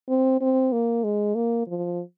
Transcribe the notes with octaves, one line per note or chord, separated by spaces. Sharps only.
C4
C4
A#3
G#3
A#3
F3